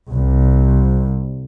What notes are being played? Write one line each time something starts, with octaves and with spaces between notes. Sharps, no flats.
C2